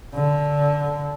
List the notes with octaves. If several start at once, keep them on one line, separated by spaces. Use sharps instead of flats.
D3